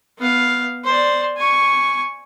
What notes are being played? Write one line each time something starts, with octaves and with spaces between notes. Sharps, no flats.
B3 F5
C5 D5
G#5 C#6